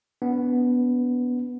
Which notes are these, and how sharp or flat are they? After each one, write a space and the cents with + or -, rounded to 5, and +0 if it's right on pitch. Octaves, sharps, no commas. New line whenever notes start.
B3 +0 D4 -30